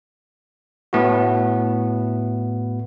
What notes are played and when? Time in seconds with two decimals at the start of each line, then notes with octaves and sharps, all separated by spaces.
0.93 A2 B3 E4 F#4